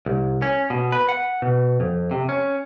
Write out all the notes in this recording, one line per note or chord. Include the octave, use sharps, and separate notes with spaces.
C2
C#4
B2
B4
F#5
B2
F2
C3
C#4